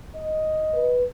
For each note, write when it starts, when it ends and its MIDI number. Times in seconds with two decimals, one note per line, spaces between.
0.16 0.96 75
0.74 1.04 71